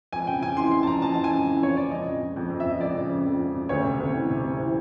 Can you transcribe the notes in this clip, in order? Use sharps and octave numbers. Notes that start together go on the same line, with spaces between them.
F2 G#5
C#3 G5
C#3 G#5
E3 C6
E3 C6
A5
F2 A#5
F2 A5
E3 A5
G#5
C#3
E3
F2 C#5
C#3 D5
F2 D#5
C#3
C#3
F2
F2
E5
F2
D#5
F2 D5
C#3
F2
F2
C#3
C#3
D2 C#5
C3
D2
E3
C3
C3
E3